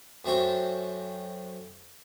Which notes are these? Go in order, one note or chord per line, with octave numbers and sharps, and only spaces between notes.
F#2 A3 C4 D4 C#6